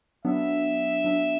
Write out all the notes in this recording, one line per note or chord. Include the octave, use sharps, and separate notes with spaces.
F#3 B3 D4 E5
F#3 B3 D4